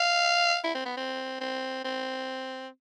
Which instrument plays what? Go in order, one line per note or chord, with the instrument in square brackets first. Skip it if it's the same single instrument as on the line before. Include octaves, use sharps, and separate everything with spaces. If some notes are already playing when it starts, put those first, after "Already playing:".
Already playing: [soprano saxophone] F5
E4
C4
B3
C4
C4
C4